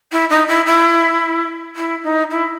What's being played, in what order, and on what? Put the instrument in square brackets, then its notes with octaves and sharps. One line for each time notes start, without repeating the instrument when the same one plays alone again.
[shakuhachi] E4
D#4
E4
E4
E4
D#4
E4